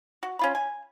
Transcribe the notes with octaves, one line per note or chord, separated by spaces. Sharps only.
F#4
C#4 F4 B5
G#5